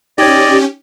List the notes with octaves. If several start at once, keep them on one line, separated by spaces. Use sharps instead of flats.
C#4 D#4 G4 D5 D#5 G5 G#6